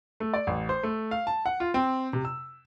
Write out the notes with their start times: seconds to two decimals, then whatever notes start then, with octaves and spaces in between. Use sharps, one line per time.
0.20 A3
0.33 D5
0.47 A1
0.69 C5
0.83 A3
1.11 F5
1.27 A5
1.46 F#5
1.60 F4
1.74 C4
2.13 C3
2.25 E6